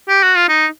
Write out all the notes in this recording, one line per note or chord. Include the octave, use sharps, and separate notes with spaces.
G4
F#4
F4
D#4